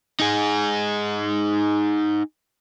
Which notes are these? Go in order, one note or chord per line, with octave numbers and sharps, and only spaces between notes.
D#4 G#4